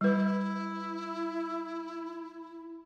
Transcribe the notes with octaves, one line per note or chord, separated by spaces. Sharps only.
G3 E4 B4